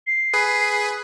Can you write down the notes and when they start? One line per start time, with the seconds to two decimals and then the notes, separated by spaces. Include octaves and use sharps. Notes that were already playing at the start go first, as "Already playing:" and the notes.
0.07 C7
0.34 G#4 B4